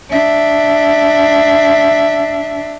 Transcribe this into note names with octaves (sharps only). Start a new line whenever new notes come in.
D4 E5